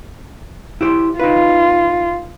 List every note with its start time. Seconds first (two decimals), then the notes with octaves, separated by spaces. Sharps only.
0.81 E4 G4 C5
1.20 D#4 F4 B4